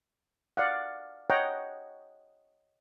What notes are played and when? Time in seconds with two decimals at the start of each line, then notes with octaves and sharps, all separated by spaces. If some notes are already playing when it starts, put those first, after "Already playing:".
0.57 D5 F5 F#5
1.30 C#5 D#5 F#5 G5 A#5